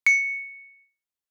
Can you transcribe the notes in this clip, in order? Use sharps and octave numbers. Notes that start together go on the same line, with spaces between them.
C#7